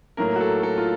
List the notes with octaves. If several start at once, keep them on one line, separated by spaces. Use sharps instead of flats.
A2 F#3 A#3 A#4
F#4
A4
A4
F4